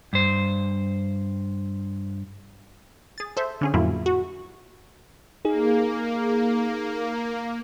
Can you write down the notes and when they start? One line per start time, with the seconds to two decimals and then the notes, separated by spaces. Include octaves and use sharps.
0.13 G2 C5
3.18 G#4 A6
3.37 A4 C5 E5
3.61 D3 C#4 G#4
3.74 F2 A2 F#3 A#3 E4 F4
4.06 F#4
5.45 A#3 D#4 G#4